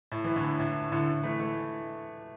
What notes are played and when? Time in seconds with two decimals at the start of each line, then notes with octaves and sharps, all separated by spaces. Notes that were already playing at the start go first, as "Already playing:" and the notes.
0.12 A2
0.24 E3
0.36 A2 D3
0.59 A2
0.92 A2 D3
1.23 E3 A3
1.39 E3 A3